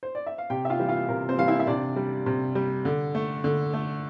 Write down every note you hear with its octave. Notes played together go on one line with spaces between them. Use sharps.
C5
D5
E5
F5
C3 G4 G5
E5
F4 F5
E3 G3
F4 F5
C3 A#4
C4 C5
E3 G3 F5
E4 E5
E5
C3 D4 D5
G3
C3
G3
D3
A3
D3
A3